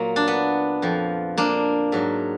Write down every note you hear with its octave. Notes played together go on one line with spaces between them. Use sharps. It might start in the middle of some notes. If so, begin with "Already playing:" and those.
Already playing: A#2 F#3 A#3
D4
B3
F2 F3
A#3 D4
G#2 F#3